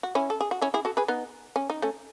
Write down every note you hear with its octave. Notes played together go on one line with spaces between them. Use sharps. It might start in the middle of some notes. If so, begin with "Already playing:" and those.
F#4
C#4 E4
A4
G#4
F#4
C#4 E4
E4 G#4
F#4 A4
G#4 B4
B3 D#4
C#4
D#4
A3 C#4